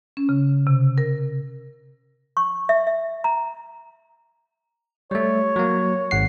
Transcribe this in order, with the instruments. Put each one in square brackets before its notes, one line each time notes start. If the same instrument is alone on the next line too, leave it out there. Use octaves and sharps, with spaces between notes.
[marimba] C#4
C#3
C3
A#4
[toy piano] C#6
E5
E5
A#5
[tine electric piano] G3 A3 [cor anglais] C#5
[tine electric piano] F#3 A#3
G#1 F#5 C7